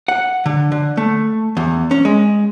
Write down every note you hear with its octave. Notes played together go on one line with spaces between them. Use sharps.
F#5
D3
D3
A3
E2
C#4
G#3